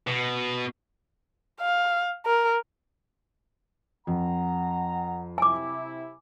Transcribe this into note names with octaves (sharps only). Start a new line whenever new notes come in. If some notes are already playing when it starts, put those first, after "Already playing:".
B2
F5
A#4
F2 F#5 A#5
C3 E4 G#5 D6